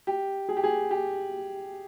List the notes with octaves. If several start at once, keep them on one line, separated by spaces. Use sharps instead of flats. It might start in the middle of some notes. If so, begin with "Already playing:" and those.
G4
G#4
G4
G#4
G4